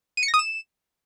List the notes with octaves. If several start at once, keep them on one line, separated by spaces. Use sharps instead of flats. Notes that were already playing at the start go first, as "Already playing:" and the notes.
D#7
C#7
A#6
D#6
E7